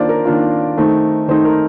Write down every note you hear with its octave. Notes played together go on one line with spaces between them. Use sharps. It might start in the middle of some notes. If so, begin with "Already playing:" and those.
Already playing: D#3 A#3 D4 F4 C5 D5
A#4
D#3 A#3 D4 F4
D#3 A3 C4 D#4
D#3 A3 C4 D#4 C5
A#4